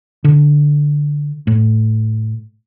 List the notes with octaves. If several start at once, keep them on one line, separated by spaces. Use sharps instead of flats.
D3
A2